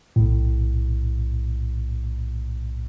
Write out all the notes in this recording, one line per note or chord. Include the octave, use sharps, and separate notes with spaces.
B1 A2